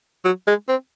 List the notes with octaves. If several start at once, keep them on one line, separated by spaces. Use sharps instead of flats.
F#3
G#3
C4